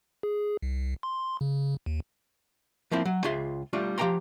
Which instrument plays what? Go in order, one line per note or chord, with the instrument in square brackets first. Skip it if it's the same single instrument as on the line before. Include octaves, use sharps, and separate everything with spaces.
[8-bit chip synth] G#4
C2
C6
C#3
D#2
[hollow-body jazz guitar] F3 A#3 C4 E4
F#3
C#2 F4 G#4 E5 C6
G3 A3 D4 F4
F3 G4 F5 G5 A#5 C6